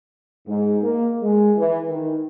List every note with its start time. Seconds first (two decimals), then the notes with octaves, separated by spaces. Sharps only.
0.48 G#2
0.83 A#3
1.22 G#3
1.57 E3
1.89 D#3